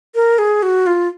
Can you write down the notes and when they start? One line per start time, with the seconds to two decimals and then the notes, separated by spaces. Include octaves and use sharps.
0.15 A#4
0.38 G#4
0.63 F#4
0.87 F4